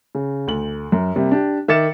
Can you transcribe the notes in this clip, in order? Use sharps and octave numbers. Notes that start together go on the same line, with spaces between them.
C#3
D2 F#7
F#2
C3 G3 A#3
D4 G4
D#3 E5 D6 A6 C#7 E7